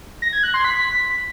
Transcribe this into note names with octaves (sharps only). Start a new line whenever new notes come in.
A#6
G#6
F#6
C6
B6